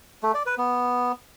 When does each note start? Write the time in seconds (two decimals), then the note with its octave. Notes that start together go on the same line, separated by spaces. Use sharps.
0.23 A3
0.34 D5
0.46 B4
0.58 B3